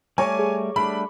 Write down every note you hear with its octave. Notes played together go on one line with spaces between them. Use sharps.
G3 A3 C#5 G#5 A#5 D6
G#4
G3 A3 D4 B5